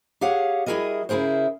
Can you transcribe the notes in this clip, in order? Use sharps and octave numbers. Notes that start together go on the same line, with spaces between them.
G4 G#4 C#5 F5 F#5
G3 E4 F#4 G#4 A#4 D#5
C#3 E4 G#4 A#4 C5